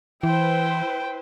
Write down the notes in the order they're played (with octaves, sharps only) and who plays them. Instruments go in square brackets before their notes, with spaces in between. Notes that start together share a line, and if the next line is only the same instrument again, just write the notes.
[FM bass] E3 [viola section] E4 B4 C5 [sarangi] G5